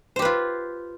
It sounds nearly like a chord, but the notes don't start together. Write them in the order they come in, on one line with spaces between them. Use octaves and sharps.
C5 G4 B4 F4